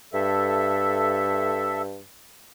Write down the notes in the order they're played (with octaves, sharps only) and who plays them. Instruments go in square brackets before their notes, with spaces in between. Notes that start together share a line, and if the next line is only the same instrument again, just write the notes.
[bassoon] G2 [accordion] A4 E5